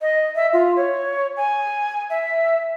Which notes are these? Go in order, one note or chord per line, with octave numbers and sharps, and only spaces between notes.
D#5
E5
F4
C#5
G#5
E5